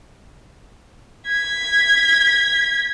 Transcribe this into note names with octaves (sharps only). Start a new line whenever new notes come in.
G#6 B6